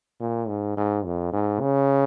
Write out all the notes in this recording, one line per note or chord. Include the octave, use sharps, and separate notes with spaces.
A#2
G#2
G#2
F2
G#2
C#3